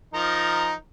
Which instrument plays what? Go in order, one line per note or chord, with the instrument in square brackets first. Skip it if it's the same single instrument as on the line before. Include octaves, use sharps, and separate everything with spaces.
[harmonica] F3 D#4 A#4